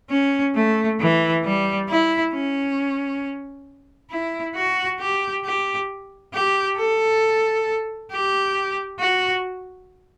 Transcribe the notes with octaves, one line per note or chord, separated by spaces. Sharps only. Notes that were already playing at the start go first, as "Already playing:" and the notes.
C#4
A3
E3
G3
E4
C#4
E4
F#4
G4
G4
G4
A4
G4
F#4